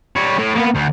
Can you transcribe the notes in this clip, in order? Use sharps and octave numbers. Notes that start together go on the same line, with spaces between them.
G3 C#5
A2
A#3 B3
D2